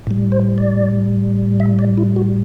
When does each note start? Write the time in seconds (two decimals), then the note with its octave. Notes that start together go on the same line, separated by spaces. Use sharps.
0.07 A2 G3
0.32 C5
0.58 D5
1.60 E5
1.79 D5
1.97 E4
2.16 F#4